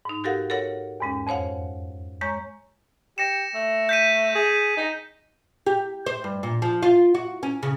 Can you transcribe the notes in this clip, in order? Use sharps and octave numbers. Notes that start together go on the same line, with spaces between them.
G#2 D#4
F#4 G4 A4 A#4 F5 F#5
A4 A#4 C#5 F#5
E2 G#2 G#3 C#4
F2 C5 C#5 F5 F#5
G#3 C#5 A#5 C#6 G6
G4 A#6 C#7 E7
A3
G6 B6 D#7
G#4
D#4
G4
C5
G2
A#2
F3
F4
F#4
C#4
C#3